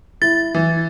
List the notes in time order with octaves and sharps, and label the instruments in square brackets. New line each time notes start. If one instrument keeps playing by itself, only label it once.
[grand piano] E4 [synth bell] A6
[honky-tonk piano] E3